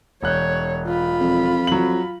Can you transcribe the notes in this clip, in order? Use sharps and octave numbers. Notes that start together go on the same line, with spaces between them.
E1 C#5 F#6 G6
F4 B5
F2
F#3 F#7